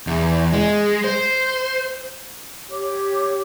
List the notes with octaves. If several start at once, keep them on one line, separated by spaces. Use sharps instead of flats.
E2
G#3
C5
G4 C#5 D6